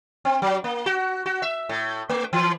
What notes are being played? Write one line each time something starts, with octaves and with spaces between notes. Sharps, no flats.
C4
F#3
A#3
F#4
F#4
E5
A2
A3
E3